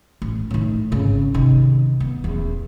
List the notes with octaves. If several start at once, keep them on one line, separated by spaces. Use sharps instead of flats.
A1
A2 D#3
G#1 C#3
C3 D#3
B3
D#1 E2